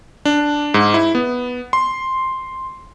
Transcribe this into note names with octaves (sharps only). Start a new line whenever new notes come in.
D4
G#2
E4
B3
C6